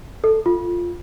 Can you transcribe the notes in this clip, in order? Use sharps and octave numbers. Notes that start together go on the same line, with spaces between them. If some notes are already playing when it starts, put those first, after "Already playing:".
A4
F4